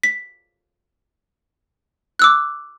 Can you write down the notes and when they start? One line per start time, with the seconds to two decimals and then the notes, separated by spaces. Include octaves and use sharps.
0.03 B6
2.19 D6 E6 F#6